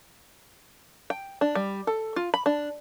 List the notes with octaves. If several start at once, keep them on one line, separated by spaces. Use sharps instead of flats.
G5
D4
G3
A4
F4
B5
D4